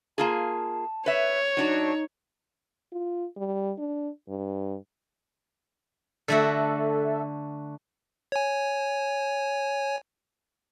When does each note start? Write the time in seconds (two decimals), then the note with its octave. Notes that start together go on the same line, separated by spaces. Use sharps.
0.18 A#3 F4 G#4 A5
1.06 B4 C#5 E5
1.57 F#3 D4 D#4 F#4
2.92 F4
3.37 G3
3.78 D4
4.29 G2
6.28 D3 A3 F#4 A4 E5
8.32 C#5 G#5